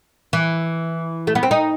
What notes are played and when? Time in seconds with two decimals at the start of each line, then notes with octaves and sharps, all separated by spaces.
0.33 E3
1.27 A3
1.35 B3
1.43 C4
1.51 D#4